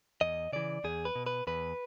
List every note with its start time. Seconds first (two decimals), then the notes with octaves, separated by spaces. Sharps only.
0.21 E2 D#5
0.52 C#3 E3 D5
0.84 E2 G#4
1.05 B4
1.16 B2
1.26 B4
1.47 E2 B4